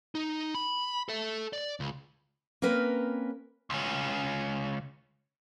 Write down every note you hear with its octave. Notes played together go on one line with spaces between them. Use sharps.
D#4
B5
A4 E5
D5
C#2
A#3 C4 C#4 A#4 B4
C#2 C#4